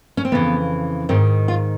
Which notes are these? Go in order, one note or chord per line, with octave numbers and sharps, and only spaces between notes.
C#4
C4
F2 C#3 E3 B3
G#2 D#3 C4
F4